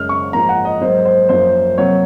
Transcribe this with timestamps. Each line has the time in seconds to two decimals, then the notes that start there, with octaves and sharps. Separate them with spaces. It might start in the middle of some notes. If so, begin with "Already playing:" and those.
Already playing: F#2 C#3 G#3 F6
0.09 C#6
0.33 G#2 F3 A#3 A#5
0.49 F#5
0.65 D#5
0.81 G#2 F#3 A#3 C5
1.05 C5
1.29 F#2 F3 A#3 C5
1.77 C3 F#3 A#3 C#5